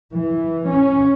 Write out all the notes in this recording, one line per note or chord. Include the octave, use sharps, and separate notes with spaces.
E3
C#4